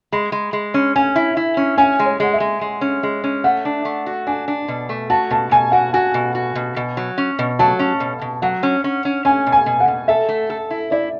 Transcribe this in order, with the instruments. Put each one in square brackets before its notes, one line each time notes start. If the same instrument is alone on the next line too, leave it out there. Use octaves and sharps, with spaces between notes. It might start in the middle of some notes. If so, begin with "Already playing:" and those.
[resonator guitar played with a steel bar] G#3 [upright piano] B5
[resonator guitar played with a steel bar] G#3
G#3
C#4
[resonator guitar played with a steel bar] C#4 [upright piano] G#5
[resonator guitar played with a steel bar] E4
E4
C#4
[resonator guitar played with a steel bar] C#4 [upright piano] G#5
[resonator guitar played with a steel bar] G#3
[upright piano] C#5
[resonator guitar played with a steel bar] G#3 [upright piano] F#5
[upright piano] E5
[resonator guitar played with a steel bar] G#3
G#3
C#4
G#3
C#4
[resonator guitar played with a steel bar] A3 [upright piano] F#5
[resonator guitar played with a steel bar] D4
A3
F#4
[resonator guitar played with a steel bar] D4 [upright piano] G#5
[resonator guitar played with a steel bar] D4
B2
A3
[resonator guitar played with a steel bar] F#4 [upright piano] A5
[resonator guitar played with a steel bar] B2 [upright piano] A5
[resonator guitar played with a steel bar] B2 [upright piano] G#5
[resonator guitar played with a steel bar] F#4 [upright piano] F#5
[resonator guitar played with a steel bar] F#4 [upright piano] G#5
[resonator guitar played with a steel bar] B2
F#4
B2
B2
F#3
C#4
B2
[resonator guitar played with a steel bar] F#3 [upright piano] A5
[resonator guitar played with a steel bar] C#4
B2
B2
[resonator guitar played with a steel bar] F#3 [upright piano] F#5
[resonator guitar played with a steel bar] C#4
C#4
C#4
[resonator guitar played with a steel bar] C#4 [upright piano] G#5
[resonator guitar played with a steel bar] B2
[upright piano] G#5
[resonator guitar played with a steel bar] B2
[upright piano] F#5
[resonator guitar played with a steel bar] B2
[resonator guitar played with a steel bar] A4 [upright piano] E5
[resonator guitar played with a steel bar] A3
A4
E4
[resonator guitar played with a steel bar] E4 [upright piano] D5